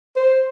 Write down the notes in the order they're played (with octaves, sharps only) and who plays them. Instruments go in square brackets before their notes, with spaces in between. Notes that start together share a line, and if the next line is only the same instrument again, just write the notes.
[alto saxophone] C5